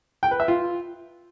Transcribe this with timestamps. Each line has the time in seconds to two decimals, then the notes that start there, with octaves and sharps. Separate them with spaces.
0.23 G5
0.31 B4
0.40 E5
0.48 F4